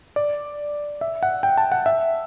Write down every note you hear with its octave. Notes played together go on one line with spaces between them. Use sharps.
D5
E5
F#5
G5
A5
F#5
E5